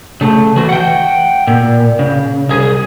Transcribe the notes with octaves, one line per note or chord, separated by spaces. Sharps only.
C#3 A3
E3 F#4
F#5 G5
A#2
C#3
C2 G#4